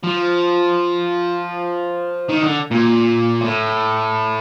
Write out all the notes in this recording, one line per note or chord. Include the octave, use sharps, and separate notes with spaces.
F3
D#3
D3
A#2
A2